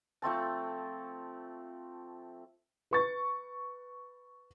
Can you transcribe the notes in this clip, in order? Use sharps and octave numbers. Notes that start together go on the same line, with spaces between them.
F3 A3 C4 A5
B4 C#6 A6